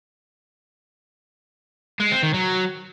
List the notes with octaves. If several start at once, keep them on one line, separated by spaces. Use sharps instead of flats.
G#3
C4
D#3
F#3